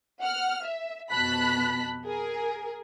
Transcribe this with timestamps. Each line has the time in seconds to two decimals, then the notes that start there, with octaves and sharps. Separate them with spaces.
0.20 F#5 F6
0.64 E5
1.11 F2 B2 A5 B5 F#6 B6
2.07 G#4 A#4